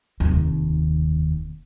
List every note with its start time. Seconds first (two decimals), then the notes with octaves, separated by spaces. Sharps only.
0.20 F1 D#2